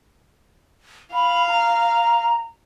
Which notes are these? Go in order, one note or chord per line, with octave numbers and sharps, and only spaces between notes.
F5 B5
A#5